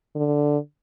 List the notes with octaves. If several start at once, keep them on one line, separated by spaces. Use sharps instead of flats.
D3